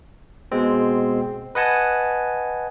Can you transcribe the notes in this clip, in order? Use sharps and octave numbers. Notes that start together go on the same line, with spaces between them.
B2 G#3 C4
B4 D#5 F#5 G#5 A5